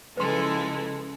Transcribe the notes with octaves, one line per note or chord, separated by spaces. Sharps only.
C#3 E3 F3 G#3 A4 B4 C6